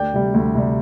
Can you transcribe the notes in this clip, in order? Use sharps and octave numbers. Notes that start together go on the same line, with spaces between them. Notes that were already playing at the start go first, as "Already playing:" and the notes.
Already playing: D2 D5 G5
C3 G3
D2
C3 G3